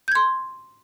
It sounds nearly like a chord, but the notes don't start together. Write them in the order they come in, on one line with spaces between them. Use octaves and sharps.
G6 G#6 C6